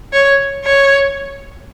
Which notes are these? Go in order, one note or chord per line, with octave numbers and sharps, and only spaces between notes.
C#5
C#5